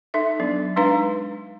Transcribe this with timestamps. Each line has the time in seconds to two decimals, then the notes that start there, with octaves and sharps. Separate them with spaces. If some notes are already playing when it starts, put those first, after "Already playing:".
0.14 D#4 A4 E5
0.40 F#3 B3 D4
0.76 G#3 D4 D#4 B4 F5 A#5